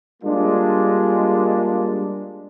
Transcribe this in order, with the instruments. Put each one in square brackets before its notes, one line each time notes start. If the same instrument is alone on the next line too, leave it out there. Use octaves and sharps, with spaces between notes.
[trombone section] G3 G#3 A#3 D4 F4